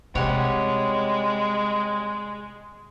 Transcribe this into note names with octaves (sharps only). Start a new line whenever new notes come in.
C3 G3 G#3 C#5 F#5